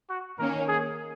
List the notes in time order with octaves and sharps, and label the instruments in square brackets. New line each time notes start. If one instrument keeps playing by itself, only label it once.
[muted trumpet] F#4
[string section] D#3 A#3 C#4 [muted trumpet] A#4
[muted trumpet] G#4